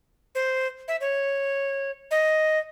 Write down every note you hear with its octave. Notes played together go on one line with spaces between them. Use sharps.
C5
E5
C#5
D#5